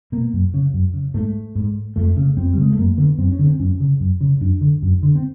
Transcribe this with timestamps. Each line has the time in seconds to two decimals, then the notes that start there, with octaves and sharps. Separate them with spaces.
0.12 B2 A#3
0.33 F#2
0.54 C#3
0.74 F#2
0.93 C#3
1.14 G#2 A3
1.55 G#2
1.96 F2 A3
2.16 C#3
2.37 F2 C4
2.53 G3
2.57 C#3 G#3
2.70 A3
2.78 F#2 A#3
2.97 D3 B3
3.18 F#2 C4
3.32 C#4
3.39 D3
3.46 C4
3.59 F#2 C#4
3.80 C#3
4.00 F#2
4.21 C#3
4.41 F#2 D4
4.61 D3
4.82 F#2
5.03 D3
5.15 C4